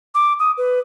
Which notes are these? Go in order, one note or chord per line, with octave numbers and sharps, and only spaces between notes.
D6
D#6
B4